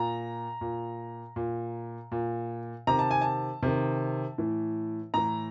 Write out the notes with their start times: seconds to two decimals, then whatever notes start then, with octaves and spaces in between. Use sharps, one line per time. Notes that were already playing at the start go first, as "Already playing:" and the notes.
Already playing: A#2 A#5
0.61 A#2
1.36 A#2
2.12 A#2
2.87 C3 D#3 A#5
2.99 A5
3.11 G#5
3.22 A5
3.63 C3 D#3
4.38 A2 E3
5.14 A2 E3 A#5